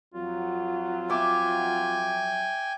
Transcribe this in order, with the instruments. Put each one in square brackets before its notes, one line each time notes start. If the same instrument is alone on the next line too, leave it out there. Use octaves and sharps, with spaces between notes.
[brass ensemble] F2 F#3 [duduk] F4
[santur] E5 D6 [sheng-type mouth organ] G5 G#5